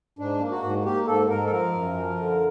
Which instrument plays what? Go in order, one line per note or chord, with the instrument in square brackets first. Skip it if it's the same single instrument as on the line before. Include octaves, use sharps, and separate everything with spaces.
[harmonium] G#2 D4
A#3
F#4
G#2
A#3 G4
G#2 A4
G#2 A#4
A4
F3 A#4
F#2
F3
D3